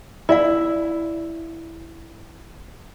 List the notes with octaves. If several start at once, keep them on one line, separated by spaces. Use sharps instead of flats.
E4 F4 D5 F5